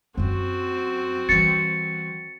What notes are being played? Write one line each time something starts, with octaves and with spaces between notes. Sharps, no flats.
F#2 F#3 C4 F#4
E3 G3 A6 C#7